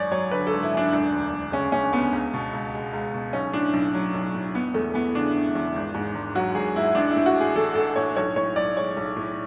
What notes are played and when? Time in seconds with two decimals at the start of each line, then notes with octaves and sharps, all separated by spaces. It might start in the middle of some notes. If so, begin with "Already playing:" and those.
Already playing: G#1 F#2 C#5 D5
0.11 F#3 C#5
0.31 D3 B4
0.47 A4
0.53 G#1
0.63 E4
0.73 F#2 D4
0.93 E1
1.12 D2
1.33 E1
1.52 C#3 C#4
1.72 E1 C#4
1.93 D2 B3
2.13 C#2
2.34 B2
2.53 C#2
2.74 G#3
2.93 C#2
3.14 B2
3.33 B1 C#4
3.53 A2 D4
3.73 B1
3.95 F#3
4.15 B1
4.34 A2
4.54 E1 B3
4.74 E2 A3
4.94 E3 B3
5.15 C#3 D4
5.35 E1
5.55 E2
5.76 G#1
5.94 G#2
6.15 G#1
6.35 F#3 F#4
6.55 G#1 G#4
6.76 G#2 E4
6.95 A1 D4
7.11 E4
7.16 A2
7.26 F#4
7.36 G#3 G#4
7.55 E3 A4
7.75 A1 A4
7.96 A2 C#5
8.17 B1 C#5
8.36 A2 C#5
8.56 B1 D5
8.76 G#3 C#5
8.97 B1
9.16 A2